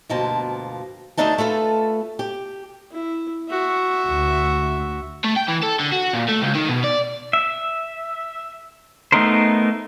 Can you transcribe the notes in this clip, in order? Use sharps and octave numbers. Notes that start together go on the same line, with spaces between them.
D2 G2 B2 F3 A#3 A5
D2 A3 D4 D#4 A5
A3 F4 A4 B4
G4
E4
F#4 E5
D2
A3
G5
E3
A4
D3
F#4
A#2
A3
C#2
D#3
B2
D5
E5
A3 B3 D#4 A#4 C5